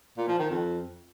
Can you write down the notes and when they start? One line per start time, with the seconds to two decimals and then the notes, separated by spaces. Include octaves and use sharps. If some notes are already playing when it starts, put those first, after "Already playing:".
0.17 A#2
0.28 F3
0.39 D#3
0.50 F2